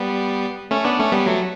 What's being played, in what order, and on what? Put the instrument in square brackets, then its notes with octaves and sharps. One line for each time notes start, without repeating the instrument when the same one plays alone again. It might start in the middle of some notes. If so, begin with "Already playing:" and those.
Already playing: [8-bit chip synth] G3 B3
A3 C#4
B3 D4
A3 C#4
G3 B3
F#3 A3